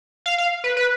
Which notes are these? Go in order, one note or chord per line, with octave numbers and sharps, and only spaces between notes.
F5
F5
B4
B4